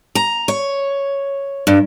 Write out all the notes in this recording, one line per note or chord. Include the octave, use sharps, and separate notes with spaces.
A#5
C#5
G2